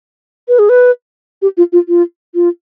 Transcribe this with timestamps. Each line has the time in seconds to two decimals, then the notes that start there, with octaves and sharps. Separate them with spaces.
0.48 B4
0.59 G#4
0.69 B4
1.42 G4
1.57 F4
1.72 F4
1.88 F4
2.35 F4